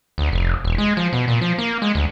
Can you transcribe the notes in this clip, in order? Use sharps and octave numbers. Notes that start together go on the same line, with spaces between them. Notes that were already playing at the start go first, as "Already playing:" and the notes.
D2
F1
E1
G#3
F3
B2
A#2
F3
A#3
G#3
D2